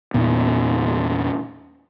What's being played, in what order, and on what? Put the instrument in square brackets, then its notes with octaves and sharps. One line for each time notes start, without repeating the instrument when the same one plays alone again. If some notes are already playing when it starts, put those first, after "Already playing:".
[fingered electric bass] E2 A#2 B3